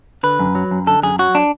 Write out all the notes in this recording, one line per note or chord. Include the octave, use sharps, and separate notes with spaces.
D3 B4
F#2
F#3
F#2
D3 A4
F#2 G#4
F#3 F#4
D4